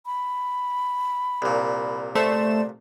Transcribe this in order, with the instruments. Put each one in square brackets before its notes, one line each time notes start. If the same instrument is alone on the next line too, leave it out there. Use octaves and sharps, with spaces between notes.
[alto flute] B5
[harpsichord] C2 A#2
[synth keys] A3 C5 E7 [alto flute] D5